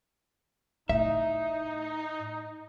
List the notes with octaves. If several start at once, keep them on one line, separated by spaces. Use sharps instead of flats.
A2 D#4 E5